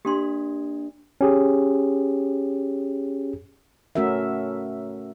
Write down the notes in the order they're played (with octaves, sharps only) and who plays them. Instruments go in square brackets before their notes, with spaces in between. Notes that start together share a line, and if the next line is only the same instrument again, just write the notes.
[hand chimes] A#3 D4 [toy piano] G4 C6
[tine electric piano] C#4 G4 G#4
[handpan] A3 C#4 F#4 A#4 E5